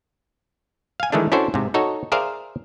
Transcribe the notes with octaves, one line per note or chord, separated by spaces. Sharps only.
F5 G#5
D#3 E3 G#3 A3 D4
C#4 D4 E4 F#4 A4 C5
G#2 C3
D#4 F#4 A4 C#5
G#4 A#4 C5 D5 E5 F5